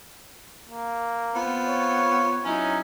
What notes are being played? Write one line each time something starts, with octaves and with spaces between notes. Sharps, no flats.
A#3
B3 C4 F4
C#5
F#3 C#4 D#4 E4